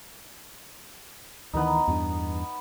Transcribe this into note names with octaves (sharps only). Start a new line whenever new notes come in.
D2 D#3 E3 B3 D#4
E2 G2 D4